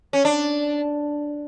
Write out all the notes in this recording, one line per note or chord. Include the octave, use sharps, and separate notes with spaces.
C#4
D4